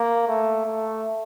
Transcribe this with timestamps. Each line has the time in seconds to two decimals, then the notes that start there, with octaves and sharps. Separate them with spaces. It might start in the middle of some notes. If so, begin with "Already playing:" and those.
Already playing: A#3
0.28 A3
0.66 A3